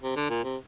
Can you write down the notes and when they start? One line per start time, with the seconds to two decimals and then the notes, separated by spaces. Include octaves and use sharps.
0.02 C3
0.16 D3
0.30 A#2
0.44 C3